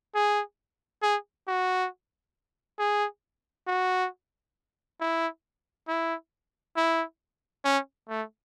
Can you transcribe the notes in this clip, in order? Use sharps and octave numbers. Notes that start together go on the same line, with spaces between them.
G#4
G#4
F#4
G#4
F#4
E4
E4
E4
C#4
A3